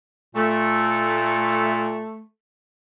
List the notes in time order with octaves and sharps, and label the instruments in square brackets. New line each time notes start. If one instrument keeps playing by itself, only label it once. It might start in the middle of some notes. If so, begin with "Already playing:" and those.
[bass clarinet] A#2 [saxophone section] A3